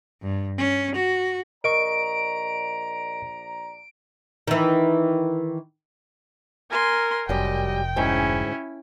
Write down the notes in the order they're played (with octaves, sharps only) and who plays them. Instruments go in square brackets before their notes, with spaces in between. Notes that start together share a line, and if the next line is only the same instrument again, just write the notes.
[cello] G2
C#4
F#4
[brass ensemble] A#1 D5 A#5 [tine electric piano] A#4 D#5 C#6 [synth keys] D7
[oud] D#3 E3
[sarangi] A#4 [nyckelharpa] G#5 C6
[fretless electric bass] F1 [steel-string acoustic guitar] F#2 G3 [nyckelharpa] D#5 [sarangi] G5
[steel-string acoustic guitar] D2 G#2 G#4 [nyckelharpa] C#4 E4